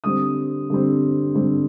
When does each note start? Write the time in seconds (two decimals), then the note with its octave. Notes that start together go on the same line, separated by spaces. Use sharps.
0.04 D3 G3 C4 D#6
0.70 D3 G3 C4
1.35 D3 G3 C4